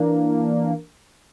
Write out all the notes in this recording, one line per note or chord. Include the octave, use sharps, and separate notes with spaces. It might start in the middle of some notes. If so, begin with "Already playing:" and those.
Already playing: E3 A#3 D4